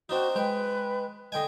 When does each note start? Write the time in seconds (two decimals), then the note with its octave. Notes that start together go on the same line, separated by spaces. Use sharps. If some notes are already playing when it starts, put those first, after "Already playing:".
0.09 C4 D4 D#4 F#4
0.35 G#3 B4 G5
1.32 D3 D#5 G5 G#5